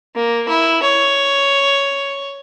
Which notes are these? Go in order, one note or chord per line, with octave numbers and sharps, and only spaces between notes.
A#3
E4
C#5